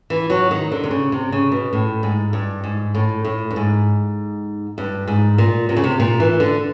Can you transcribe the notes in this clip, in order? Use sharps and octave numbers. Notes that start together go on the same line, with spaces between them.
E3
F#3
D#3
D3
C3
C#3
C3
C#3
B2
A2
G#2
G2
G#2
A2
A2
G2
G#2
G2
G#2
A#2
C3
C#3
C3
A#2
E3
D3